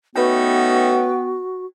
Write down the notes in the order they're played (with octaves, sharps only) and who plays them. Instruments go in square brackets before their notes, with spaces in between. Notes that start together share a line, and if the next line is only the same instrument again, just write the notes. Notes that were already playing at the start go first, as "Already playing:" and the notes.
[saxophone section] A3 C#4 D#4 [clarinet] B3 [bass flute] F#4 [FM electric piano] B4 G5